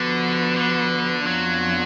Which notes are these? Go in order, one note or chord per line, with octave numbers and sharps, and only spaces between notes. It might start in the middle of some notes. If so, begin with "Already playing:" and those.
Already playing: D3 F3 B3 F#4 B4
D3
F2 F3 F#3 B3 D4 F4